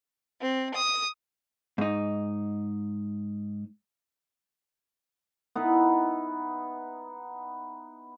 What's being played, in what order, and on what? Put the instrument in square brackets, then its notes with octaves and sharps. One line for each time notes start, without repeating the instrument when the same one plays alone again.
[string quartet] C4
D#6
[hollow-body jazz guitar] G#2 D#4
[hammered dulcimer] B3 D#4 E4 B4